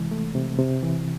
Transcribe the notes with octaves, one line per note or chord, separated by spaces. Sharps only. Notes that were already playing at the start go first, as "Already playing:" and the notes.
Already playing: C3 E3 G#3
A3
C3
C3
E3